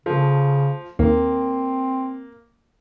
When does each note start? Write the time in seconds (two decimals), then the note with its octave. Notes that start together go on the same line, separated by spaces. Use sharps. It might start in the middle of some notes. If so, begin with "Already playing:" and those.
0.06 C#3 F3 A3
0.99 D#2 A#3 C4